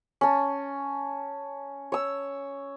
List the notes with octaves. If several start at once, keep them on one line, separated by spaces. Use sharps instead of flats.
C#4 A5
C#5 E6